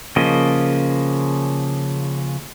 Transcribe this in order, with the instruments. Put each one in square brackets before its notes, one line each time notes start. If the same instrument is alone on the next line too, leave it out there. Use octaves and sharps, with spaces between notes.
[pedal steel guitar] C#3 F3 A#3 D#5